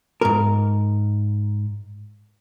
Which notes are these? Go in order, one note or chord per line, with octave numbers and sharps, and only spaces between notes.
G#2 A#4